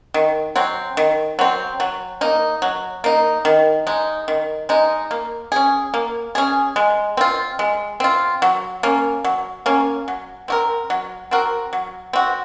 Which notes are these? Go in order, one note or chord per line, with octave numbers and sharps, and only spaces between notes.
D#3
F#3 C4
D#3
F#3 C4
F#3
A#3 D#4
F#3
A#3 D#4
D#3
G#3 D#4
D#3
G#3 D#4
A#3
C#4 G#4
A#3
C#4 G#4
G#3
C4 F4
G#3
C4 F4
F#3
A#3 C#4
F#3
A#3 C#4
F#3
C4 F#4 A#4
F#3
C4 F#4 A#4
F#3
C4 F#4